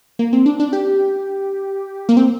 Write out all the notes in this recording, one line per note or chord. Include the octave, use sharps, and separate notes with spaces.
A#3
C4
D4
D4
G4
A#3
C4